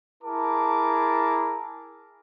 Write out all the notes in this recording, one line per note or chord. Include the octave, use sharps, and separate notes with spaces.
E4 G#4 A#4 A5 D6